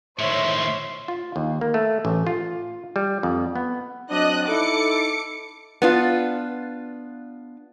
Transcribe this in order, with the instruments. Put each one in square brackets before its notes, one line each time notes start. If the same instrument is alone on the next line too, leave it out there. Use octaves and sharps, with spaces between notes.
[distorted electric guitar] A2 D#3 [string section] C5 C#5 E5 [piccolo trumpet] C6
[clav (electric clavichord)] F4
D#2
A#3
A3
A1
F4
G3
F2
B3
[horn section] F#3 C4 D4 [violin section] D#5 F#6
[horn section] D#4 E4 A4 [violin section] D6 C#7
[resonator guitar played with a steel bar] B3 D4 F4